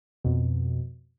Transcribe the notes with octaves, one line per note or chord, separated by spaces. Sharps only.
F2 B2